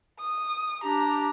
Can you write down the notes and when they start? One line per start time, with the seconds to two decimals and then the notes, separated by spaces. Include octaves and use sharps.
0.20 D#6
0.84 D4 G4 A#5